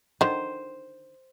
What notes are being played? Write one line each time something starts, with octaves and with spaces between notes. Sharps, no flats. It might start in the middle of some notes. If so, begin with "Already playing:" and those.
D3 D#3 C5